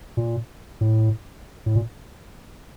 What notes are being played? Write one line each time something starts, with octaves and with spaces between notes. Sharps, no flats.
A#2
A2
A2
A#2